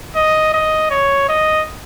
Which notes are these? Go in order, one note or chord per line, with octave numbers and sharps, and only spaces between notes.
D#5
D#5
C#5
D#5